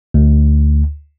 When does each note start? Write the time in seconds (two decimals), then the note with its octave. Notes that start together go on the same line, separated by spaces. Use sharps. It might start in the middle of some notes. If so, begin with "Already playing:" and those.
0.14 D2